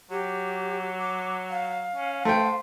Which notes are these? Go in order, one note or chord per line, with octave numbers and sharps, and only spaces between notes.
F#3 G4
D6
F5
C#4
A3 C5 G5